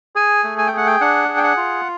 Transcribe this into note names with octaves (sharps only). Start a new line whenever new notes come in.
G#4 G#5
A3
G#5
G5
G#4 F#5
G5
D4 F#5
G#4
G5
F#5
F4